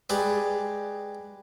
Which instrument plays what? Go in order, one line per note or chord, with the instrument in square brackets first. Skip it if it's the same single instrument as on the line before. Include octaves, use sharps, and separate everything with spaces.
[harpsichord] G#3 G4 B4 D5